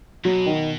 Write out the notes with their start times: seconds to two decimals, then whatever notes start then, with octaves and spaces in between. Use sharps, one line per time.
0.24 B2 F#3
0.46 D#3